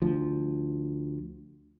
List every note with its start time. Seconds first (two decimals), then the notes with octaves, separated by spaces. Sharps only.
0.02 D2 F3